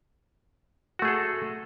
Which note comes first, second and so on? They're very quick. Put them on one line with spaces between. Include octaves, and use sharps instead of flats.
F#4 A3 G#4 A4